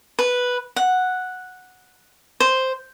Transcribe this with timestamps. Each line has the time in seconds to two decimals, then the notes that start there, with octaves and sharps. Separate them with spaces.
0.19 B4
0.76 F#5
2.40 C5